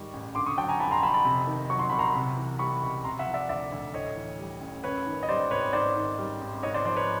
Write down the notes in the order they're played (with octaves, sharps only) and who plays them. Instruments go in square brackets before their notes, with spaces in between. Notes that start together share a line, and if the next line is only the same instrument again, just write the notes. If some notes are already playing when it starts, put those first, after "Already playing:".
Already playing: [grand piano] G#2 D#3 G3 C#6
A1
D3 C6 D6
C#6 D#6
F#3 G5 A5
G#5 A#5
F2 A5 B5
A#5 C6
F2 A5 B5
A5 B5
C3
D#3
F#3 C#6
C6
C2 B5
A#5 C6
C3
E3
G3 B5 C#6
C#2
C3 A#5 C6
E5 F#5
F3
D5 E5
D2 D5 E5
D2
A2 C#5 D#5
E3
G3
A1
F#2 B4 C#5
D#3
D#5
G3 C5 D5
G#1 B4 C#5
G#2 C5 D5
D#3
G3
G#1
G#2 C#5 D#5
C5 D5
F3 C5 D5
B4 C#5